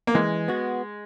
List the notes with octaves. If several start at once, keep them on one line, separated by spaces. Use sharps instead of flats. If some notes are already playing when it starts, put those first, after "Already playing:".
A#3
E3 G#3
B3 F#4